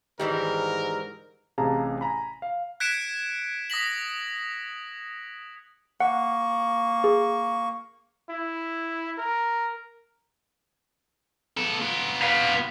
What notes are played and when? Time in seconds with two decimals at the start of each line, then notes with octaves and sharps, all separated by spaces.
0.19 G#2 D#3 E3 G3 A#4
1.58 A1 C3 G#4 F5 A5 A#5
2.01 G#5 A#5 B5
2.42 F5
2.80 F#6 G#6 B6 C#7 D7 E7
3.70 D#6 A#6 B6 F#7
6.00 A#3 F#5 C#6
7.04 G#4
8.30 E4
9.18 A#4
11.57 B3 A4
11.82 B3 F4
12.22 B4 F5